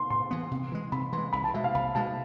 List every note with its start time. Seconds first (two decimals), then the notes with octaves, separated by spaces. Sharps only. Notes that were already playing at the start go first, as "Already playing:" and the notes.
Already playing: C6
0.10 A2 C6
0.31 E3 B3
0.51 C3
0.72 E3 G#3
0.92 C3 B5
1.13 E3 G#3 C6
1.33 C2 B5
1.44 A5
1.54 B2 G#3 E5
1.64 F5
1.74 C2 B5
1.95 B2 G#3 A5